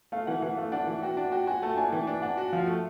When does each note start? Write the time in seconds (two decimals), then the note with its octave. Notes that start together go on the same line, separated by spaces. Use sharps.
0.12 A3 F5
0.27 E3 F#5
0.42 E3 F#5
0.57 A3 F5
0.72 D4 F#5
0.87 E3
1.02 F#4 G5
1.17 D4
1.32 F#4 G5
1.47 F#4 G#5
1.62 A3 A5
1.77 D4 G#5
1.92 E3 G5
2.07 D4
2.22 D4 F#5
2.37 F#4
2.53 F3 F5
2.67 A3